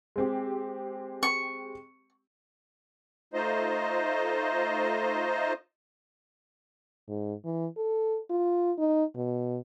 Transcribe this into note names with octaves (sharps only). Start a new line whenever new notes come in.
G#3 C4 G4
C#6
A3 D#4 F4 C5 D#5
G#2
E3
A4
F4
D#4
B2